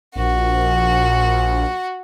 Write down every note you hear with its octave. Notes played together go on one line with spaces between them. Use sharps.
A#1 F#4